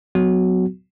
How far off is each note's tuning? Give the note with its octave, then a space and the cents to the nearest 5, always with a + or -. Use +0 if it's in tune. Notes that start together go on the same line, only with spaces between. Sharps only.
F#3 +0 B3 +30 F#4 +0